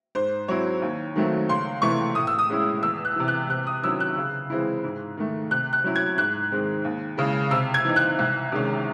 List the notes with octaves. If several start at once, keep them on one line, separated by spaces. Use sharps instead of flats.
G#2 C5
F#3 C4 E4 C#5
D#2
D#3 F#3 A3 C4
C#2 C6
C3 E3 A3 C#6
A2 D#6
E6
D#6
G#3 C#4 E4
E2 E6
F#6
C3 E3
F#6
C3 F#6
D#6
D#3 F#3 C#4 E4 E6
F#6
C#3
E3 G#3 C4 E4
G#2
D#3 A3
C3 F#6
F#6
F#3 C#4 E4
G#6
G#2 F#6
D#3 G#3 C4
D#2
C#3 G#3 C#4 E4
C3 E6
G#6
E3 C4 D#4
F#6
C2
C3 D#3 G#3 C#4